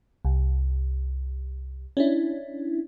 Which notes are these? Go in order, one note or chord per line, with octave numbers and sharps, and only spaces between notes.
C2
C#4 D4 E4